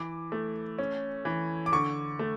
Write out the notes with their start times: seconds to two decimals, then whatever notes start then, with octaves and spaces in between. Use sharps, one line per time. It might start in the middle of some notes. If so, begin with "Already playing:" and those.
Already playing: E3 D6
0.32 A3
0.79 C#4
1.25 E3
1.66 D6
1.72 D3 C#6
2.19 A3